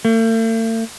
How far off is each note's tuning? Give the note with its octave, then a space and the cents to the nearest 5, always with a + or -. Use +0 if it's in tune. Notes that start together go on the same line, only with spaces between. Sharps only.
A3 +45